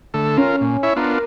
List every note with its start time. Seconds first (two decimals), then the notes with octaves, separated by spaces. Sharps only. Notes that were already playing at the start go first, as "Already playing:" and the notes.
0.14 D3 A3 A4
0.37 C#4 F4 A#4
0.61 A#2
0.83 E4 C#5 E5
0.96 B3 D4 F4 A#4